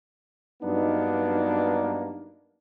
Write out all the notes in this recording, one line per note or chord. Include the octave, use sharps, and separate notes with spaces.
G2 F#3 A#3 B3 D4 D#4